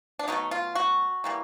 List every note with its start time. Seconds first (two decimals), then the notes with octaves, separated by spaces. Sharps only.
0.19 D4
0.28 B2 F#3 A3 D#4
0.51 F4
0.75 F#4
1.24 E3 G3 A#3